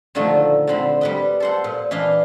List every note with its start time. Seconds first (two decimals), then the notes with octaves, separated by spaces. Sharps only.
0.15 A#2 D3 D#3 F3 A3
0.67 D3 C4 B5
1.01 G3 B4 D#5
1.40 A4 C5 F#5
1.64 A#2
1.91 E3 D4 D#5 F5